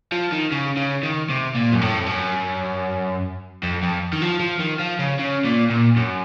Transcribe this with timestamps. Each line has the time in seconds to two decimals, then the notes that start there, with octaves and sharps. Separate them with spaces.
0.12 F3
0.32 D#3
0.51 C#3
0.77 C#3
1.03 D#3
1.29 C3
1.55 A#2
1.72 F#2
1.81 A2
2.00 F2
2.07 F#2
3.63 F2
3.83 F2
4.13 D#3
4.22 F3
4.40 F3
4.60 D#3
4.79 F3
4.99 C#3
5.19 C#3
5.45 A#2
5.71 A#2
5.96 F#2